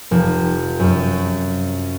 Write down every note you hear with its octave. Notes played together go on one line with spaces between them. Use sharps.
F1
F#2